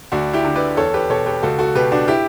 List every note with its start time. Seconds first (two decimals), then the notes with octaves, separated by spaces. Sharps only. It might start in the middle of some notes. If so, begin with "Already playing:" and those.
0.12 D2 D4 F#4
0.33 E4 G4
0.44 D3
0.56 B4 D5
0.77 E2 A4 C#5
0.94 G4 B4
1.10 B2 A4 C#5
1.26 G4 B4
1.43 C#2 F#4 A4
1.59 F#4 A4
1.75 B2 G4 B4
1.92 D4 F#4
2.08 E4 G4